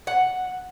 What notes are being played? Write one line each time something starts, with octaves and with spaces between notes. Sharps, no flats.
F#5